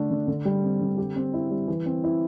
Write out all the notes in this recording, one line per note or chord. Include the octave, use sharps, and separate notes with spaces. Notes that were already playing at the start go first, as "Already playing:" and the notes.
Already playing: D3 A3 D4
D3
D3
G3
C4
D3
G4
C4
E4
G3
E3
C4
E4